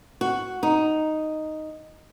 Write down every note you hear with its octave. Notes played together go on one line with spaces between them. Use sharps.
F#4
D#4